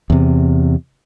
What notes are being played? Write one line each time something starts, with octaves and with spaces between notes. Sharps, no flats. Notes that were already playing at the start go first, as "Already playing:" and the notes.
E2 C3